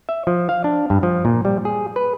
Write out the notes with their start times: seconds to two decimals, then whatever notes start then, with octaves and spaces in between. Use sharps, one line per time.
0.09 E5
0.27 F3
0.49 F5
0.64 D4
0.90 G2
1.03 F3
1.25 A#2
1.45 G3
1.65 G#4
1.96 B4